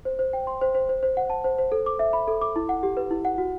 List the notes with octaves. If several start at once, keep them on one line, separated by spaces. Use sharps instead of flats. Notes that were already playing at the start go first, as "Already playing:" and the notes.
C5
C5
G5
C6
C5
C5
C5
C5
F#5
A5
C5
C5
A4
D6
E5
B5
A4
D6
E4
F#5
G4
B4
E4
F#5
F#4